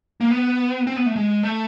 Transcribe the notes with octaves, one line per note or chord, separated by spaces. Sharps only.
A#3
B3
C4
B3
A3
G#3
A3